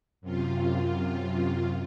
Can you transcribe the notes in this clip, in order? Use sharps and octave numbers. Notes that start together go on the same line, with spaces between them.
F#2 C3 F4